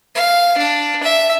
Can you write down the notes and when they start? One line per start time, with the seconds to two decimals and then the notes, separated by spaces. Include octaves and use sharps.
0.15 F5
0.58 D4
1.03 E5